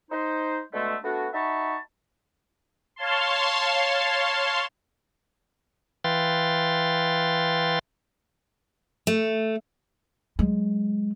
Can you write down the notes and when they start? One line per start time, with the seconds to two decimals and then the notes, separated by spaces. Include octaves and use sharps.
0.11 D#4 C5
0.73 B2 D3 G#3 A3
1.04 A3 B3 D4 F#4
1.33 D#4 F#4 E5 A5 B5 C#6
2.96 C#5 F5 A5 C6
6.04 E3 B4 F5 G5 C6 A6
9.07 A3
10.39 F#3 G#3